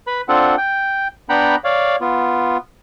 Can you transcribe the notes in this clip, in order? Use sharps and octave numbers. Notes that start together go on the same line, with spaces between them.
B4 B5
C4 D4 F4 A4 F#5
G5
B3 D4 F#5 G5 A#5 B5
C#5 D5 F5
B3 F4